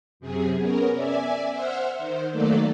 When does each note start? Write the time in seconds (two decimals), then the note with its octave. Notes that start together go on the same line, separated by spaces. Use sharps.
0.20 F#2 C3 G#4
0.57 B3 C#4 A#4
0.93 D5 E5 G#5
1.50 C5 E5 F#5 F6
1.98 D#3 C5
2.31 D#3 F#3 A3 A#3 A4 D5